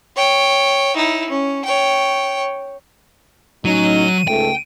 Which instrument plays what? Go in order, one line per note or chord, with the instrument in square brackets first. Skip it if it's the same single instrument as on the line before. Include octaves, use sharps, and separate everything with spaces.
[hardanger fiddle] C#5 G5
D#4 E4
C#4
C#5 G5
[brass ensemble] A2 C#4 D#4 [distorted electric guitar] F#3 [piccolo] D#7
[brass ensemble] C#2 G#2 A3 [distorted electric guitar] G5